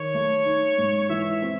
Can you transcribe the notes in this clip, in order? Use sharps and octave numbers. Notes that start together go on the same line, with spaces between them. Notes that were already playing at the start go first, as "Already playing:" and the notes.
Already playing: D#3 C#5
A3
D#4
G#2
E3 E5
C4